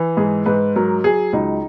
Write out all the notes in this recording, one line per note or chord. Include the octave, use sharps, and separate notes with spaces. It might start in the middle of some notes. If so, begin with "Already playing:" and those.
Already playing: E3
G#2 G#4
G#2 B4
F#3 A#4
F#3 G#4
C#2 D#4